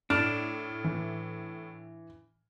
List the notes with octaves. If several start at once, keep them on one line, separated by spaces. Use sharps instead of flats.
A2 D4 F6
E3